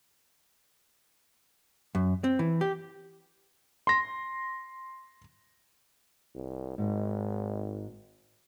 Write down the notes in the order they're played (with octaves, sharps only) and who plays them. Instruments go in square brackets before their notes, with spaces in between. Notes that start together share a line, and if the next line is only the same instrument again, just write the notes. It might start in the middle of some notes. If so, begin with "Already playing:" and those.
[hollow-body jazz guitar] F#2
C4
E3
G4
[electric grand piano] C6 A#6
[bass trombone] C2
[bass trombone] G#1 [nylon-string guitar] G#2